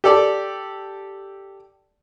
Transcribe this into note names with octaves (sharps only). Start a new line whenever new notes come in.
G4 A4 D5